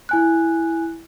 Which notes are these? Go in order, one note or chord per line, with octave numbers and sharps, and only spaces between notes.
E4 G#5 F#6